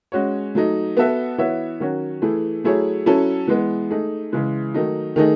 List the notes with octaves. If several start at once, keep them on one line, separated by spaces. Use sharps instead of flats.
G#3 C#4 F#4 C#5
F#3 A3 D#4
B3 F#4 A4 E5
E3 B3 F#4 C#5 E5
D#3 F#3 C#4 F#4 C#5
E3 A3 E4 G#4
F#3 A3 E4 G#4 C#5
F#3 C#4 E4 A4
E3 G#3 B3
A3 D#4 G#4
C#3 E3 G#3
D#3 F#3 A3 D#4
D#3 A3 D#4 G#4